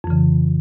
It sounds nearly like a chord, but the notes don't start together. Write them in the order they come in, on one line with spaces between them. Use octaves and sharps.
F2 E3 C#3